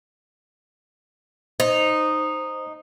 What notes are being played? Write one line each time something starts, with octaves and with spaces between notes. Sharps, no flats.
D#4 C5